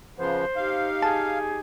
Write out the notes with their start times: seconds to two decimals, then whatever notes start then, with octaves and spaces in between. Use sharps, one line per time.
0.18 C#3 F3 B3 C5
0.56 D#4 G4 F5
1.02 G#4 A5